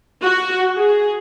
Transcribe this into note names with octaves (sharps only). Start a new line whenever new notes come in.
F#4
G#4